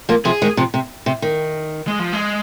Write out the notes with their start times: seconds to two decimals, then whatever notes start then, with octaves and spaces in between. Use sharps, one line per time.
0.09 F3 A#3
0.25 C3 F3 G#4
0.42 D#3 G#3
0.57 C3 F3
0.74 C3
1.06 C3
1.22 D#3
1.87 G#3
1.99 F3
2.12 G#3